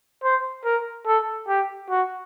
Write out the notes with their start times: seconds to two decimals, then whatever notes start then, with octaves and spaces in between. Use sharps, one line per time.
0.23 C5
0.65 A#4
1.06 A4
1.48 G4
1.89 F#4